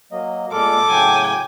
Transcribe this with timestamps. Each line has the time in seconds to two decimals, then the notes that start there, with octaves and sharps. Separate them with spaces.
0.12 F#3 A#3 D#5
0.52 A#2 G#3 A4 D6 F6
0.89 A2 C#3 F#3 G5 G#5